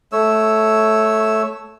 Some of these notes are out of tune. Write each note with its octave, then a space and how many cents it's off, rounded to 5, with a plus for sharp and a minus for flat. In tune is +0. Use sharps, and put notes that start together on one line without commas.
A3 -10 C#5 +0 E6 -5